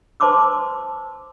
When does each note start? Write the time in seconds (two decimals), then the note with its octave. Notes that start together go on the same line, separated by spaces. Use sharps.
0.20 B4 C5 A5 C6 D6 E6